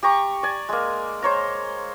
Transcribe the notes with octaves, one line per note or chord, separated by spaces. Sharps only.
G4 A#5 C#6
D5 G#5
G#3 A#3
C5 C#5 A#5